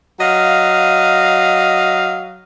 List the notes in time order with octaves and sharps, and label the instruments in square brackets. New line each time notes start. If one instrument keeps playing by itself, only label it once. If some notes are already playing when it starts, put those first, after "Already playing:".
[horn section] F#3 D#5 F5